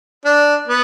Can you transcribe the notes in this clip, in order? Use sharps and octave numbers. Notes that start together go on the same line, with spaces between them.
D4
B3